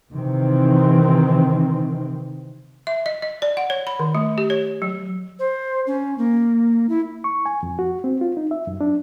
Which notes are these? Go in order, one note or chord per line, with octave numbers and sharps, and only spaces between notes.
C3 D#3 E3 C4
E5
D#5
D#5
D5
F#5
C#5
B5
D#3
A3
G4
C#5
F#3
C5
C#4
A#3
E4
C#6
G#5
F2
F#4
C4
F4
D#4
E5
F#2
D4